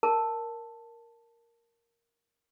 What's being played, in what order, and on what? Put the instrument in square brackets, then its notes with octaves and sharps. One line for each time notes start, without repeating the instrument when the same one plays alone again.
[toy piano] A#4 A5